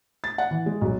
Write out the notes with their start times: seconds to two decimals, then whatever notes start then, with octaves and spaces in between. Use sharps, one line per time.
0.24 A6
0.38 F#5
0.51 E3
0.66 G#3
0.81 B1